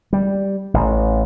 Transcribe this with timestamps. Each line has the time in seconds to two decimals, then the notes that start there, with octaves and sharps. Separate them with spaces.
0.13 G3
0.74 A1